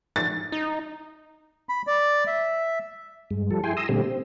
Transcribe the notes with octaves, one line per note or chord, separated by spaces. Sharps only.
A6
D#4
B5
D5
E5
G2 G#3
F3 G3 A4
E4 G#4 G5 G#5 C6
A#5 C6 D#6 E6
A#2 D3 G3 A3 C4 G4
C4